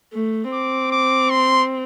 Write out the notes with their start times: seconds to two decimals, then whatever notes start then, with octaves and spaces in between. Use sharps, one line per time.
0.14 A3
0.52 C4 D6
0.91 D6
1.30 C6